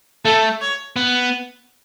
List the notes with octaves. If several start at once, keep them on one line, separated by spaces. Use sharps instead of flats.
A3 A4
C#5
B3